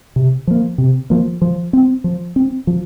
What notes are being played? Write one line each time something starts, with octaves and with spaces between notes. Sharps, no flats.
C3
F3 A#3
C3
F3 A#3
F3
C4
F3
C4
F3